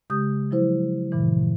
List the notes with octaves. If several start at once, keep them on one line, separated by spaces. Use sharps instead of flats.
C#3 G#3 G4 D#6 G6
F3 F#3 E4 C5
G2 A#2 C#3 E3